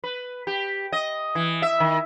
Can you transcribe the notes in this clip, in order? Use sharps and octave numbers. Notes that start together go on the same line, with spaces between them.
B4
G4
D#5
E3
E5
D#3